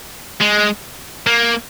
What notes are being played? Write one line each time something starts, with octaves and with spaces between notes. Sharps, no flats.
G#3
A#3